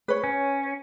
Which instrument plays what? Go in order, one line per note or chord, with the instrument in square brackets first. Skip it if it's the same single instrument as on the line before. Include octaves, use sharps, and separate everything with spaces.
[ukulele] B4 C#5
[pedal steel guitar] C#4